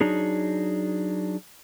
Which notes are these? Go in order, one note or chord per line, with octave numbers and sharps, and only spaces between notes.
F#3 D4 D#4 G#4